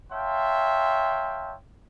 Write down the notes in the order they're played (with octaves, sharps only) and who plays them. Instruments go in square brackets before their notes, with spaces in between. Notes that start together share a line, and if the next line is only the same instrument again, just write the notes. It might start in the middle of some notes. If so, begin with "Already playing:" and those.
[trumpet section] C#5 E5 F5 G5 A5 C6